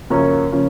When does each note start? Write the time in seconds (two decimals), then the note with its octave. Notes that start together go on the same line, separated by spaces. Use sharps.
0.10 F#2 C#3 F3 A#3 C#4
0.52 C#3 F3 A#3 C#4